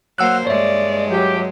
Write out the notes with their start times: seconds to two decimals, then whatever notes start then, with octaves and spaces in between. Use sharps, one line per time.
0.18 F#3 A#3 C5 F#5 E6 F#6
0.47 G2 G#3 C#5 D5 E5
1.12 F#3 G4